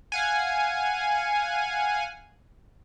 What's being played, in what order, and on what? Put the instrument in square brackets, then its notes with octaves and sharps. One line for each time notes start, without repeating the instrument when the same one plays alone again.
[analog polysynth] F5 F#5 G#5